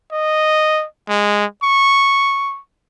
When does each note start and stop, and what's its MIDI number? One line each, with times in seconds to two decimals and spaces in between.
0.12 0.85 75
1.09 1.45 56
1.63 2.60 85